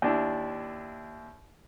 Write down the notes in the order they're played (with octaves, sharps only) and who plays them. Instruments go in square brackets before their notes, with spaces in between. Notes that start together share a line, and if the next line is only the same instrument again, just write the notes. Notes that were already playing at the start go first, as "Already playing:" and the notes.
[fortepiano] D#2 D4 E4